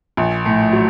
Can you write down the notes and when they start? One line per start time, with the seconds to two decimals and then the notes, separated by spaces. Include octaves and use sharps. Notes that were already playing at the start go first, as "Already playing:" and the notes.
0.17 A#1
0.45 A2
0.73 F#3